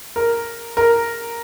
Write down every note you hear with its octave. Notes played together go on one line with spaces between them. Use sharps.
A#4
A#4